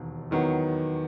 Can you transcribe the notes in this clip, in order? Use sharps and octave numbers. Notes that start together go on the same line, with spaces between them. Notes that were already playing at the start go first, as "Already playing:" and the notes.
Already playing: E1 D#2 D#3
E2 D#3 F#3 B3